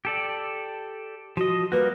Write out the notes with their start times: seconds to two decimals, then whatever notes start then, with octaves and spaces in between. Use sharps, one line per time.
0.05 G4 A4 D5
1.37 F3 F#4 D#5
1.72 G3 A#3 F#4 B4